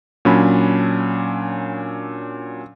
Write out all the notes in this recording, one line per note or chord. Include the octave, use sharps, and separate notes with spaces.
A#2 F#3 C#4 D4 B5